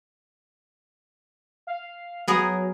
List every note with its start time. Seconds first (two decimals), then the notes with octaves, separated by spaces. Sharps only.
1.67 F5
2.28 F#3 B3 G#4 A#4